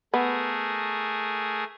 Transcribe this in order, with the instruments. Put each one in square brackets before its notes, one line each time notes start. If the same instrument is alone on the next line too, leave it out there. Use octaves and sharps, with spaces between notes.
[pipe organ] A3 G#4 A#4 [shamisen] B3